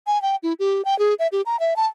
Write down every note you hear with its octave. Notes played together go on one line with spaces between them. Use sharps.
G#5
G5
E4
G4
G5
G#4
E5
G4
A#5
E5
A5